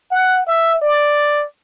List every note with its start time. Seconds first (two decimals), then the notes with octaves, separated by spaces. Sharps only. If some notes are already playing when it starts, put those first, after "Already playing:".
0.11 F#5
0.47 E5
0.81 D5